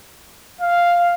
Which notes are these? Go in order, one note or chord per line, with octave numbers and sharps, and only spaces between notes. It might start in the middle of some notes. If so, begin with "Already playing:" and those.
F5